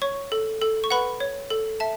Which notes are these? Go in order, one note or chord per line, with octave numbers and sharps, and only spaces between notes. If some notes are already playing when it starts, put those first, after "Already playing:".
C#5 C#6
A4
A4
C#6
B4 F#5 B5
C#5
A4
E5 A5